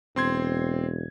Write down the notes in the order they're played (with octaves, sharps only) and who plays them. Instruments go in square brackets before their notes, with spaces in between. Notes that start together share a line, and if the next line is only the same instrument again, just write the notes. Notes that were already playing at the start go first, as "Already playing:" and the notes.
[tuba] E1 [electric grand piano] C4 C6 G#6